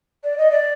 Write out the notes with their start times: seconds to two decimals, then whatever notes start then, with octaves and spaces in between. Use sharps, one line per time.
0.24 D5
0.38 D#5
0.51 D5